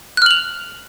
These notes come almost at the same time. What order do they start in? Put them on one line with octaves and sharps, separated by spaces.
F#6 F6 F#7 F7